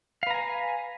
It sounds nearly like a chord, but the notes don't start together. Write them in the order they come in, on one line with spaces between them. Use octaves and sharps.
F5 B4 A#5 G#5